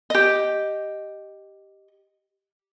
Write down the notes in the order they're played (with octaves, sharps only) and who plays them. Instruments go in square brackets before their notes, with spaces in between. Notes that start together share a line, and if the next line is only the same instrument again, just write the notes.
[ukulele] G4 D#5